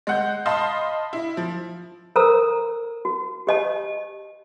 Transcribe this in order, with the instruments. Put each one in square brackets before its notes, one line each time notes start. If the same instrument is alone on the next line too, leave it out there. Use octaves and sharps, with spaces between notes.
[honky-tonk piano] G#3 F#5 G6
D#5 F5 A5 B5 C6
E4
F3
[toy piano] A4 A#4 C5 A#5 E6
F#4
G4 D#5 A5